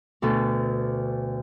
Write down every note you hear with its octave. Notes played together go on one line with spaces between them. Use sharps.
D2 B2 A4